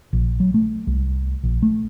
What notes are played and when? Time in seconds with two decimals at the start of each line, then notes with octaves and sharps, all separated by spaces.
0.13 A#1
0.40 F#3
0.54 A3
0.87 C2
1.43 A#1
1.63 A3